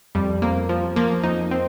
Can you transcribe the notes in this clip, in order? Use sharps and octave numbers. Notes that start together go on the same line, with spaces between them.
F2 G3
F2 A#3
F3
F3 A#3
F2 D#4
C4